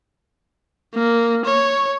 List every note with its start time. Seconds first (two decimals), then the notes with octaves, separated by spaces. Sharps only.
0.95 A#3
1.45 C#5